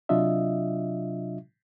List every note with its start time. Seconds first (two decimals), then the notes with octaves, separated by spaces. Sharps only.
0.09 C3 F#3 D4 F4 D#5 E5